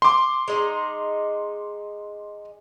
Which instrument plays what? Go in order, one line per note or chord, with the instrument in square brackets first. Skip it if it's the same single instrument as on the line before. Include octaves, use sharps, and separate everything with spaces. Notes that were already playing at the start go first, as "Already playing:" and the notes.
[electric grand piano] C6 D6
[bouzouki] G#3 D#4